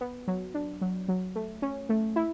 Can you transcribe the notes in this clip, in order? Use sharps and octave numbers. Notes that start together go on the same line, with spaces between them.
B3
F#3
D4
F#3
F#3
A3
C#4
A3
E4